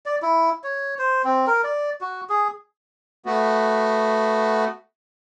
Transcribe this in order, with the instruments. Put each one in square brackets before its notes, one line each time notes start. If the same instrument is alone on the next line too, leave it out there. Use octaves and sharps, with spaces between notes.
[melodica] D5
E4
C#5
C5
C4
A#4
D5
F#4
G#4
[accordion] A3 B3 F#4